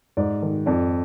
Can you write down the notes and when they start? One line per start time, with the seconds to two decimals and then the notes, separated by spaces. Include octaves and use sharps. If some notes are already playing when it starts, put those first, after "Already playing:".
0.17 G#2 D5
0.42 D#3
0.66 F2 D5